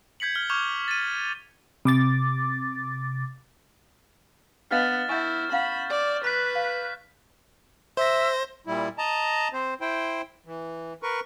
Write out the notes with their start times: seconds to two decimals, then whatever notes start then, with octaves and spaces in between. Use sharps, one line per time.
0.20 G6 G#6 B6 C#7 F#7
0.35 F6 G7
0.50 C#6 D6 F6 G6 G#6 F7
0.88 A6 D#7
1.85 C3 D6 A6
4.71 B3 D4 D#5 F5 F6 A6 E7
5.09 E4 E5 F#5 G#5 C#6 G6
5.52 C#4 F5 F#5 B5
5.90 D5
6.24 B4 B5 F#6 B6
6.55 F5
7.97 C5 E5 A#6
8.67 A#2 G3 E4
8.98 D#5 A5 A#5
9.53 C4 C5
9.81 E4 C5 G5
10.46 E3
11.03 A#4 B4 C#6